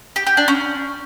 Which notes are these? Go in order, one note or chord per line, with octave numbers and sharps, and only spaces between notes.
G4
G4
D4
C#4